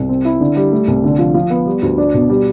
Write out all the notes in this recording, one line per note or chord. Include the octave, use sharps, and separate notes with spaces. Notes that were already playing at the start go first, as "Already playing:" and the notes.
Already playing: C2
C4
E4
D3
G3
A3
C2
D3
F3
F3
B3
G3
D2
D4
B2
G3